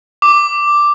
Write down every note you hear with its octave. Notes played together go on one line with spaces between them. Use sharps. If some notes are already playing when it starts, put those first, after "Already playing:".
D6